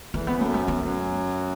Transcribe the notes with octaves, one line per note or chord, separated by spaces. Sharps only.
E2 E3 A3
B3
F#2 F#3 A3
B3
A3
F#2 F#3